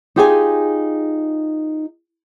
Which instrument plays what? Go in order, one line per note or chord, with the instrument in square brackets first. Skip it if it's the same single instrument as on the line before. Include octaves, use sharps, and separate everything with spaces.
[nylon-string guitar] D#4 F4 G4 G#4 G5 G#5